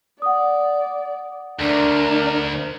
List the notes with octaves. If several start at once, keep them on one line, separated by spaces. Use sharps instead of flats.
D5 F#5 D#6
D2 D4 A#4